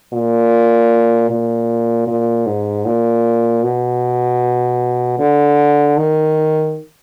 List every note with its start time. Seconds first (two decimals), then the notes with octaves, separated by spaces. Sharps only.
0.13 A#2
1.30 A#2
2.07 A#2
2.46 G#2
2.85 A#2
3.63 B2
5.19 D3
5.97 D#3